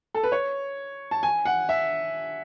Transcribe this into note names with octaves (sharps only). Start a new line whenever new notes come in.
A4
B4
C#5
A5
G#5
F#5
E5